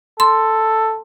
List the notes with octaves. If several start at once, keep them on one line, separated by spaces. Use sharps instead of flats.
A4 C6